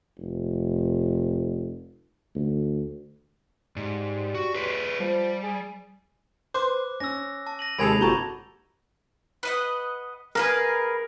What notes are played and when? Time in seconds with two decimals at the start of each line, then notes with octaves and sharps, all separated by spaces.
0.18 F1
2.35 D2
3.76 G#2 G3
4.35 F#4
4.55 G#4 B4 C#5
5.00 F3 G3
5.43 G#4
6.54 B4 C5 D6 F#6
7.00 C#4 E6 A#6
7.47 A5
7.59 A#6 D#7 F#7
7.78 D#2 C3 G#3 A4 B5 G#6 D7 F7
8.01 G1 F#4 A5 A#5 C#6 G6
9.43 B4 D#5 F#5
10.35 G#4 A#4 B4 F5